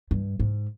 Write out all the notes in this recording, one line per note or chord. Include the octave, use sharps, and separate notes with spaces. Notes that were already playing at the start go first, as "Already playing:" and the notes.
G2
G#2